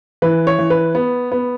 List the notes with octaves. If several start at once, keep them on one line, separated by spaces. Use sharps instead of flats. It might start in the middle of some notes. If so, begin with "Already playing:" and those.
E3 B4
C#5
E3
B4
B3
B3